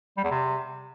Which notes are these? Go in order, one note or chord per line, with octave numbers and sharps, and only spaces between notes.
G3
E2
C3